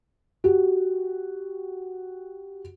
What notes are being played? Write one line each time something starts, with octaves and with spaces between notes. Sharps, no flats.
F#4 G4